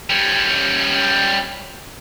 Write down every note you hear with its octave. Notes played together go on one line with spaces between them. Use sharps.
G3 C#4